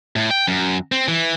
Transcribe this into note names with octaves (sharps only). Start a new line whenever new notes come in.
A2
G5
F#2
C4
E3